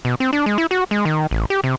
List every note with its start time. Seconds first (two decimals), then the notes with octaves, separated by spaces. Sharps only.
0.05 B2
0.20 C4
0.33 D4
0.46 G#3
0.58 E4
0.71 F#4
0.91 G#3
1.05 D#3
1.31 A1
1.50 G4
1.64 C3